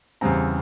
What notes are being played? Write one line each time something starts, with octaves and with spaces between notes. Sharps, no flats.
E2 C#3 G3 C4 A#5